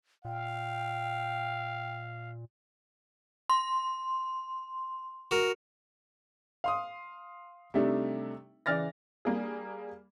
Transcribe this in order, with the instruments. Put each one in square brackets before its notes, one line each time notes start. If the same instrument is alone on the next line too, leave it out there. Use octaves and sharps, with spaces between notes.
[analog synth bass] A#2 [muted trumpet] F5 [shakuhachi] G5
[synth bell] C6
[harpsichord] F#4 A#4
[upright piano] F5 C6 D#6
C3 G3 A3 D4 D#4
C#3 E3 D5 F6 A6 A#6
[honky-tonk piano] G3 A#3 D4 G#4